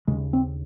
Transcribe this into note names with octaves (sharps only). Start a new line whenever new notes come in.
D#2 C#3 G#3
C4